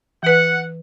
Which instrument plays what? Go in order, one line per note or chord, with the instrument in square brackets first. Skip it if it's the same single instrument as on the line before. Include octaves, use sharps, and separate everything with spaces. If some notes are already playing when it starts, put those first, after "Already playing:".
[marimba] E3 B4 [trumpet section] F#5